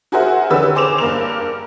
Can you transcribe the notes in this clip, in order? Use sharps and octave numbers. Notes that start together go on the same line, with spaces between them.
F#4 G#4 A#4 C5 E5 F#5
D3 G4 B4 C#5 E6
G#4 C5 D6 E7 F7
G2 A#3 A#4 F7